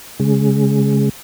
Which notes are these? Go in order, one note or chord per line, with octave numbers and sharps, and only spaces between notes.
C#3 G#3